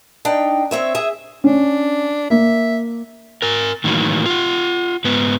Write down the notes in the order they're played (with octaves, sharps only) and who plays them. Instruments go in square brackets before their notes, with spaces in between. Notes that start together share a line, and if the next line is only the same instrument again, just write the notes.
[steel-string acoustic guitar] D4 D#4 G5
C4 C#5 E5
G#4 E5
[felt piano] C#4 [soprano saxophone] D4
[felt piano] A#3 [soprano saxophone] E5
[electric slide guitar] A#4 G#5
A2 D#3 E3 F#3 A#3
F4 F#5
G#2 B3 B4